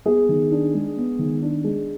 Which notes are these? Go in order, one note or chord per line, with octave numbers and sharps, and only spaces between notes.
B3 G#4
D#3
D4
G#3
B3
D#3
D4
G#3